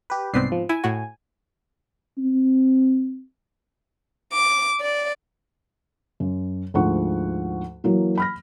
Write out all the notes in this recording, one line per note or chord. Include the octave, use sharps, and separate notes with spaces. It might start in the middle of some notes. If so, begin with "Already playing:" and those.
G4 B4
C2 G#2 B3 C4 D5 C7
F3
E4 G#5
A2 F#4
C4
D6
D5
F#2
D2 G#2 F3 F#5 C#6
E3 F#3 A#3 E4
B5 F6 A#6